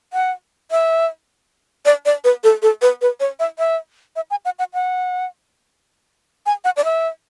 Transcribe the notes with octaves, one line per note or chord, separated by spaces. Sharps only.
F#5
E5
D5
D5
B4
A4
A4
B4
B4
C#5
E5
E5
E5
G#5
F#5
F#5
F#5
G#5
F#5
D5
E5